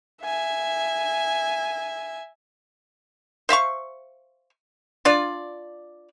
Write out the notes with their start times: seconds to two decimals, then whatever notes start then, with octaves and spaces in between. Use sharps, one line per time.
0.23 E5 G#5
3.49 C5 E5 F5 C#6
5.05 D4 F4 D5